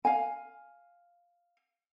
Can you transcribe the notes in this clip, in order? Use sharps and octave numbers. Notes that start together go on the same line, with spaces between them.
F5 G#5